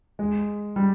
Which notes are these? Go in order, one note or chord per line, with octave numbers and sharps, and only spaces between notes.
G#3
G3